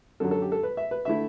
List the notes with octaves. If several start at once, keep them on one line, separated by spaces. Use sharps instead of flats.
F#2 D3 F#3 A4
A4
G4
A4
B4
E5
B4
D3 A3 E4 E5